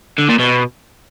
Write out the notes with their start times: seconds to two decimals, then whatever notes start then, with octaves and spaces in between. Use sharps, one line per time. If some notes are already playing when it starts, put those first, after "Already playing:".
0.19 D3
0.29 A#2
0.39 B2